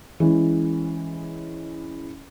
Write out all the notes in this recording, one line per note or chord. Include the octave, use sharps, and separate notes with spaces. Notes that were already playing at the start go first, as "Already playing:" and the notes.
E3 G#3 C#4